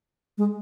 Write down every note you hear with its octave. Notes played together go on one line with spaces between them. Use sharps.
G#3